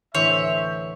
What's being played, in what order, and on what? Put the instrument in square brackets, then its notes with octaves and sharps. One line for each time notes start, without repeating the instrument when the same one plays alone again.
[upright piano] D2 A2 E3 [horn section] C5 E5 [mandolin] C#5